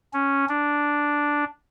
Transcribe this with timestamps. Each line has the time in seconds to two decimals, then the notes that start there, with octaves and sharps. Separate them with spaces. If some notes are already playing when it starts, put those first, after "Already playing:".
0.13 C#4
0.49 D4